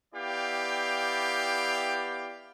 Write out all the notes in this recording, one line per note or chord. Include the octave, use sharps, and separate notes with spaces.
B3 E4 G4 D5 F5 G5